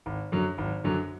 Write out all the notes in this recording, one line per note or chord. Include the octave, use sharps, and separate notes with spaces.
G#1
F#2 D3 F#3
G#1
F#2 D3 F#3